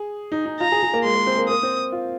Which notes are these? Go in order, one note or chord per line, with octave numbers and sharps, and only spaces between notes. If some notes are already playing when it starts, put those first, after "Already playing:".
Already playing: G#4
D#4
D#4
F4 A#5
G#4
G#4
A#3
G#3 C6
A#3
C4
A#3
A#3 D#6
C4
F4